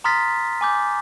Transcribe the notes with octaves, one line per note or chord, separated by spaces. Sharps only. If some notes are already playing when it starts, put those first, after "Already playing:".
A#5 C6 D#6 F6 A6 B6
G#5 D6 G6